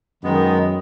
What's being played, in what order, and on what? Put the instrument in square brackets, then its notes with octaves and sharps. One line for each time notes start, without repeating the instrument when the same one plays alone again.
[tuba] F#2 [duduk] D#3 [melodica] G#3 B3